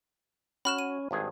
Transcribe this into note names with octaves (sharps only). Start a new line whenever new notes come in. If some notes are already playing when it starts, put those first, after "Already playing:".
C#4 F#4 B5 F6 E7
D#7
G#1 G2 G#4